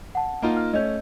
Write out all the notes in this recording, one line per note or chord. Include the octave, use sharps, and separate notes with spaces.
F#5 A5
A#3 D#4 F4
F6
A3 C#4 D#5 G6